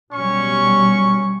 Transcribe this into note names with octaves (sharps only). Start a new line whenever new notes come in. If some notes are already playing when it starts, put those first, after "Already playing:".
B2 F#3 G3 C#4 C#6